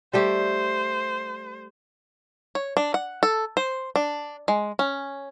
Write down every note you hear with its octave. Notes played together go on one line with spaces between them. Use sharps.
G3 A3 G4 C5
C#5
D4
F#5
A4
C5
D4
G#3
C#4